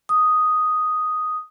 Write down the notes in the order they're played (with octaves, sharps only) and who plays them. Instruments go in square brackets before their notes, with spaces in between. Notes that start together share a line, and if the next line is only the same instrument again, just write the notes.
[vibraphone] D#6